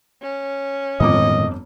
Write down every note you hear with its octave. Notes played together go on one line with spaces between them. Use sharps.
C#4
G1 F2 A2 D#3 G#3 D#5 D6